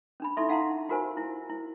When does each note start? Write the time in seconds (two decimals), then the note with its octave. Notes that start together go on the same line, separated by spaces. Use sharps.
0.20 C#4 D4 B5
0.37 D#4 E4 A4 E5 C6 C#6
0.49 D#4 F5 F#5 A5 A#5 C6
0.89 F4 F#4 A#4 C5 G#5
1.17 E4
1.49 E4